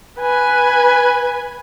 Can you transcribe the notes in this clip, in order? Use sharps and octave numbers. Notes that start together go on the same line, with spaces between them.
B4 G#5